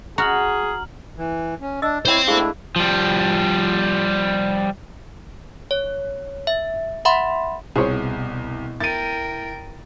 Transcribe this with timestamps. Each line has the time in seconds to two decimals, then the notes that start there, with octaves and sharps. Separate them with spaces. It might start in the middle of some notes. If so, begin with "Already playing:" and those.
0.18 F#4 G#4 A#5 F6 F#7
1.18 E3
1.61 C#4
1.82 D4 D#5 E6
2.06 E4 C5 C#5 G5
2.27 G#3 A3 D4 E4 G#4 F5
2.76 F3 G3
5.71 C#5
6.47 E5
7.05 E5 F#5 B5 C6
7.76 C2 B2 G#4 C5 C#5
8.80 E4 A#4 G5 A6 D#7